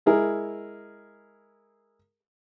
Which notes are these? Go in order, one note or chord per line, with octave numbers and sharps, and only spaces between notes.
G#3 E4 G#4 A#4